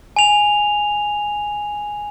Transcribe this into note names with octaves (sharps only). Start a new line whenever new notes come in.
G#5 F7